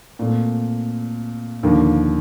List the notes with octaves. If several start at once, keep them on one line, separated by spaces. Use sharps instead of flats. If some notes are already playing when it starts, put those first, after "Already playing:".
A#2 A3 C4
D#2 D3 F3 A#3